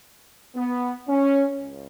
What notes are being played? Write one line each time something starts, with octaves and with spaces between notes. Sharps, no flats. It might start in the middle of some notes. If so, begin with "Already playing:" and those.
B3
C#4
C#2